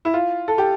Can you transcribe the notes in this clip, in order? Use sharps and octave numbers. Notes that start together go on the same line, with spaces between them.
E4
F4
A4
G4